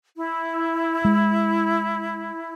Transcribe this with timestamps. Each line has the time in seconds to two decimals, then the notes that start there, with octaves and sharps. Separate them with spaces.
0.16 E4
1.05 G#3